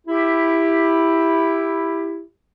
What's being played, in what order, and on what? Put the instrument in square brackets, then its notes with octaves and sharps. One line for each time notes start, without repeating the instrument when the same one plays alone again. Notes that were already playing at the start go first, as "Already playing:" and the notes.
[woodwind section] E4 G4